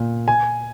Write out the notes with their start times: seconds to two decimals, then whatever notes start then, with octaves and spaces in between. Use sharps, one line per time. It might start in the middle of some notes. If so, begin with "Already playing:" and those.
Already playing: A#2
0.28 G#5